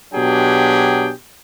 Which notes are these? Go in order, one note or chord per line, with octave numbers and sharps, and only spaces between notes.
B2 F#3 D4 G4 G#4 G5